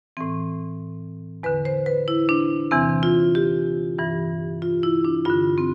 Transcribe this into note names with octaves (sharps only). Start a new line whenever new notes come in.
A2 E3 C4
E2 D3 B4
C5
B4
E4
D4
E2 C3 E3 C4
F4
G4
G2 E3
F4
E4
D4
G2 D3 F4
C4